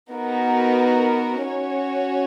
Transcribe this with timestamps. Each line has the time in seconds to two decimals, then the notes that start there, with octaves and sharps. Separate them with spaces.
0.11 B3 D#4 F#4 A#4
1.45 C#4 F#4 C#5